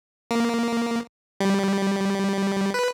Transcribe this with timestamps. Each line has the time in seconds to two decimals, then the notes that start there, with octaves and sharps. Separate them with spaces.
0.31 A#3
1.40 G3
2.74 B4